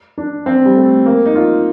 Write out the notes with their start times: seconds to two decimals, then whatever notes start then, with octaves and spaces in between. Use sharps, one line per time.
0.18 D4
0.46 C4
0.65 G3
0.76 A3
1.06 A#3
1.26 D#4
1.35 F4